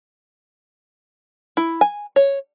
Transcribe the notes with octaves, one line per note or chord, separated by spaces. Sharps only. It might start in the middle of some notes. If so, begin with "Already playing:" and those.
E4
G#5
C#5